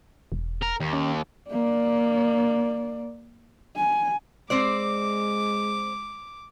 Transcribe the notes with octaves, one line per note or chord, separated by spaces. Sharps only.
E1
A#4
D#2
C#4
A#3 D5
G#5
G#3 C4 C5 D5 D6